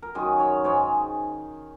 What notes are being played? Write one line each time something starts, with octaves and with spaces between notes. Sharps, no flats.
A#4
F#2 D#3 G#3 G#4
C#5
G#2 G#3 C#5